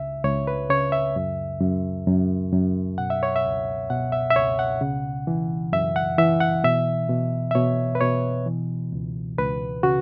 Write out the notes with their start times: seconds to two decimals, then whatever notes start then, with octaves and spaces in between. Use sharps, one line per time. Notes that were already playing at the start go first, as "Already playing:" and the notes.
Already playing: C#2 C#3 E5
0.24 C#2 C#5
0.47 B4
0.70 C#3 C#5
0.92 E5
1.16 F#2
1.61 F#2
2.07 F#2
2.53 F#2
2.98 B2 F#5
3.10 E5
3.23 C#5
3.36 E5
3.45 C#2
3.90 B2 F#5
4.12 E5
4.31 E5
4.35 C#2 C#5
4.59 F#5
4.81 C#3
5.27 E3
5.72 F#2 E5
5.96 F#5
6.18 E3 E5
6.40 F#5
6.64 B2 E5
7.09 B2
7.51 E5
7.55 B2 C#5
7.95 B4
8.01 B2 C#5
8.46 E3
8.92 C#2
9.39 C#2 B4
9.83 C#3 F#4